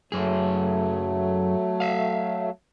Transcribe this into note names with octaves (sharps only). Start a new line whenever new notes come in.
F#2 F#3 A3 G#4
E5 F5